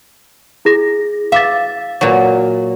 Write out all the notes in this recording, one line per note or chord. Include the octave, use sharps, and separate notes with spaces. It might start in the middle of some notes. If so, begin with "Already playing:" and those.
E4 G#4 A#6
E5 F5 D6 A6
A#2 F#3